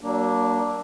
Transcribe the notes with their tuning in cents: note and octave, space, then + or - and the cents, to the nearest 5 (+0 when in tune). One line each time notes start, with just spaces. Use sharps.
F#3 +40 A#3 +10 D4 +0